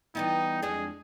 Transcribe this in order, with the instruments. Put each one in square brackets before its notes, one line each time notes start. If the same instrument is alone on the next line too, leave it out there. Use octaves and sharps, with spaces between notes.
[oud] E3 G3 B3 [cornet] D#4
[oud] F2 G#3 D4 [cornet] G#4